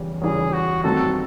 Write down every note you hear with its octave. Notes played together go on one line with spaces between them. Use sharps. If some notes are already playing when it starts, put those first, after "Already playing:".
Already playing: E2 C#3 E3 G3
E2 C#3 E3 G3 G#4
F#4
G2 D#3 F#3 A3 C4 A4